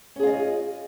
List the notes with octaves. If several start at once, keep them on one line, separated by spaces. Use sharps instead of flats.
C#4 F4 G#4 D#5